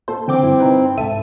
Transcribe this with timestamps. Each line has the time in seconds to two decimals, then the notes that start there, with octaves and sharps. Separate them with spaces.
0.08 A#2 A4 C5
0.28 D3 E3 C4 G5 D6
0.43 G2 E4
0.60 C3 D#4 B4
0.97 C2 G#2 A4 E5 A5 D#7